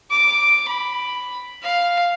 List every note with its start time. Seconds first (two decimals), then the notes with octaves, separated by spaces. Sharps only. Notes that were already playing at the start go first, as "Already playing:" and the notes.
0.11 D6
0.68 B5
1.62 F5